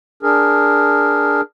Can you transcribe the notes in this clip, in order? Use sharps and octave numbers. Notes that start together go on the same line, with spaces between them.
D4 G#4 A#4